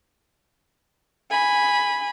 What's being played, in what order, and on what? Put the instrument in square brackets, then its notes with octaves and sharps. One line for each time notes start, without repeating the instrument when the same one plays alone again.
[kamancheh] G#5 B5